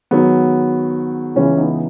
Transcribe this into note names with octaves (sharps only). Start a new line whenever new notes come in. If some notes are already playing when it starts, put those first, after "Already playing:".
G#2 D#3 F#3 B3
C#2 C#3 E3 C#4
B3 D#4